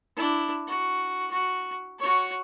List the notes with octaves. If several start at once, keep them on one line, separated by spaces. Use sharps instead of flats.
D4 E4
F#4
F#4
F#4 C#5